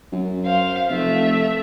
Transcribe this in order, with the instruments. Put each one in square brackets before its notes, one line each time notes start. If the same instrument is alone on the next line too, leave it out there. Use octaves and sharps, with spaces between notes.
[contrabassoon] F#2
[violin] C5 F5
[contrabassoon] F1 [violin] A3 E5